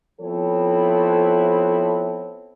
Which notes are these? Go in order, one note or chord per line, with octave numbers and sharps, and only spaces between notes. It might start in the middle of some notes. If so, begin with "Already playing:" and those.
F3 B3 C4 E4 A4 C#5